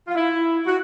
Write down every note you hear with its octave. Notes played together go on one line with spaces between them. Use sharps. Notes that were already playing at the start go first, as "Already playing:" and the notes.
F4
E4
F#4